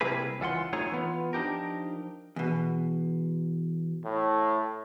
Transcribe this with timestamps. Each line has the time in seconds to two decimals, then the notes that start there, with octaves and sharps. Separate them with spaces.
0.01 C3 G3 A#3 E4 G#4 B4
0.40 C#2 E3 F4 F#5 C6
0.73 A3 D#4 F4 G#4 A4 C#5
0.92 E3 B3 F4
1.33 F3 D4 D#4 G4 A#4
2.36 E2 B2
4.05 A2